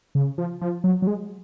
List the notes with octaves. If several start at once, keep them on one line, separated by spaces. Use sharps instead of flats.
C#3
F3
F3
F#3
F#3
G#3